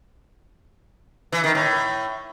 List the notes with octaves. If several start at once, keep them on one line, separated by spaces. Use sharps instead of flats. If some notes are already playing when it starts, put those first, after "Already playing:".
E3
D#3
A2